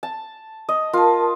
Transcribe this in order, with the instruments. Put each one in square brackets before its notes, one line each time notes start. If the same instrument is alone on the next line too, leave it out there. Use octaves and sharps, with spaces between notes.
[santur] A5
D#5
[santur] F4 [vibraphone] A#4 A5